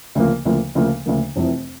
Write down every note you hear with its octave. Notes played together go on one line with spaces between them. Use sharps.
D2 C#3 F3 A#3
D2 C#3 F3 A#3
D2 C#3 F3 A#3
D2 C#3 F3 A#3
F1 F2 C3 E3